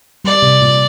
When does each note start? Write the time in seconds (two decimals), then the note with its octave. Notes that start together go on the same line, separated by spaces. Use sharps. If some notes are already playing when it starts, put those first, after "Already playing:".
0.25 G3 D5
0.42 C3
0.61 A#2